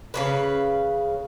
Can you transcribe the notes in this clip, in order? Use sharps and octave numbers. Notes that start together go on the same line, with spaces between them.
C#3 F3 B4